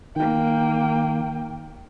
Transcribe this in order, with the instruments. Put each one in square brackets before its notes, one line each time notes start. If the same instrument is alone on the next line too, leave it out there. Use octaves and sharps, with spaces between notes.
[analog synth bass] D#3 [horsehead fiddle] A#3 G5